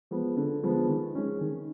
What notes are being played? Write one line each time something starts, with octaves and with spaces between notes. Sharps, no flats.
F3 G#3 B3
D3
F3 G#3 B3
D#3
G#3 C#4
D#3